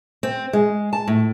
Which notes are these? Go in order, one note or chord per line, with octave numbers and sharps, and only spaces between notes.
C4
G#3
A5
A2